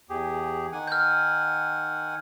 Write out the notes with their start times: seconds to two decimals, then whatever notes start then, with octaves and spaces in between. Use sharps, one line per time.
0.09 E2 G4 G#4
0.72 D#3 F#5 G#5
0.87 F6 G6